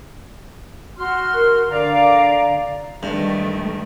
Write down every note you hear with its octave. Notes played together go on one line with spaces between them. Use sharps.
F#4 C6 F6
A#4
D3 D5 F5 A#5
G2 D#3 E3 A3